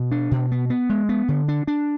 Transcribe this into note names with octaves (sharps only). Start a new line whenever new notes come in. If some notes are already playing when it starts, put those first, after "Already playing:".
Already playing: B2
D4
B2
B3
B3
G#3
B3
D3
D4
D4